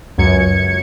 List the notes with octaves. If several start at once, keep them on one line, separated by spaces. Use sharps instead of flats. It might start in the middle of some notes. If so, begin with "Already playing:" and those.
C#2 F#2 F#3 G#6 C#7